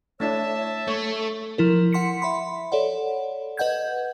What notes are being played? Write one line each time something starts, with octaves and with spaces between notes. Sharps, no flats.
A3 D4 E4 C#5 E5 A5
A3 A4 C#5
F3 E4 A#4
F#5 C6 B6 C#7
E5 B5 C6
A4 C#5 D5 F#5
B4 D#5 F#5 G6 G#6